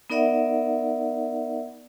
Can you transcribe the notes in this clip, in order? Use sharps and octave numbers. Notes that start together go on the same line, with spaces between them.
B3 D#4 A#4 D5 E5 F#5